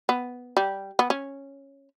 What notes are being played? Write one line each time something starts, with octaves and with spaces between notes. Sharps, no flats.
B3
G3
B3
C#4